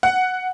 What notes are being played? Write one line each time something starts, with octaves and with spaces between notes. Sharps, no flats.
F#5